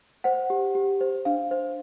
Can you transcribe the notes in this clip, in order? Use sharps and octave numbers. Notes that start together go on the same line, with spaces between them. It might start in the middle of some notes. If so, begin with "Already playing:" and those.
C5 F#5
G4
G4
C5
D4 F5
C5